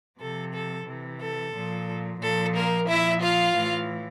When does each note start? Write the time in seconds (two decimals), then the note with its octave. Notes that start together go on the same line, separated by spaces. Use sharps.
0.19 C3 F3 A4
0.53 A4
0.86 C3 E3
1.20 A4
1.53 A#2 F3
2.21 A#2 F3 A4
2.54 A#3 A#4
2.88 A#2 F3 E4 E5
3.22 F4 F5
3.55 A2 E3